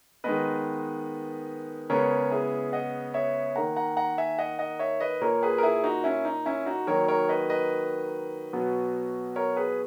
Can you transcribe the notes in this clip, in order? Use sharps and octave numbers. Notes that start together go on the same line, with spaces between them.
D#3 G#3 B3 B4 D#5
C#3 G#3 B3 A#4 C#5
E4 G#4
D#5 F#5
C#5 E5
D#3 A#3 F#5 A#5
F#5 A#5
F#5 A#5
E5 G#5
D#5 F#5
D#5 F#5
C#5 E5
B4 D#5
A#2 A#3 A#4 C#5
G#4 B4
A#4
E4 G#4
D#4 F#4
C#4 E4
D#4
C#4 E4
D#4 F#4
D#3 F#3 A#3 A#4 C#5
A#4 C#5
B4 D#5
B4 D#5
B2 F#3 B3
A#4 C#5
G#4 B4